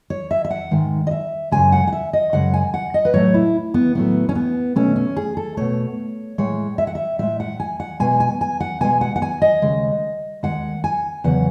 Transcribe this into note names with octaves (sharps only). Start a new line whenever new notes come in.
C#5
E5
E5
F#5
G#2 D#3 G#3
D#5
E5
F#2 C#3 G#3 G#5
F#5
F#5
E5
D#5
F#2 C#3 G#3 F#5
G#5
F#5
D#5
B4
A2 F#3 A3 C#5
E4
B3
A2 F#3 A3 B3
C#4
B3
B2 A3 C#4
C#4
G#4
A4
B2 A3 C#5
A2 G#3 C#5
E5
F#5
E5
A2 G#3 E5
F#5
G#5
F#5
B2 G#3 G#5
G#5
G#5
F#5
B2 G#3 G#5
F#5
F#5
G#5
D#5
D#2 C#3 G#3
D#2 C#3 G#3 F#5
G#5
E2 C#3 F#3 F#5